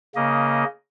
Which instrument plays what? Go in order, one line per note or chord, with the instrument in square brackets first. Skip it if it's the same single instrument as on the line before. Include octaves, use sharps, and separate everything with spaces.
[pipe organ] C#3 A#3 D#5